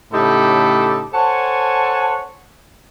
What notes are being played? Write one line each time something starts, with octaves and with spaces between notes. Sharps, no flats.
A2 C#3 D#4 G4 A4 B5
A4 C5 C#5 F#5 G#5 A5